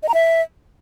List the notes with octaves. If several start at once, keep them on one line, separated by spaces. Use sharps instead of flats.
D#5
A#5
E5